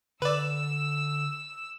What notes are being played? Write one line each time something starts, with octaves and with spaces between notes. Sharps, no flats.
D3 B4 D5 E6